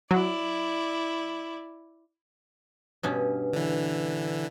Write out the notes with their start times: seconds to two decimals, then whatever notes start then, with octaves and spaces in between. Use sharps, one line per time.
0.11 F#3 E4 D5
3.03 G2 B2 C#4
3.53 D3 E3